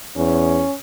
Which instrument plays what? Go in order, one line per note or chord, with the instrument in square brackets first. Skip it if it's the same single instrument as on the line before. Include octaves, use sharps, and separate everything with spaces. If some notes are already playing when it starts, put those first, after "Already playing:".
[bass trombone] E2 [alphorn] C#4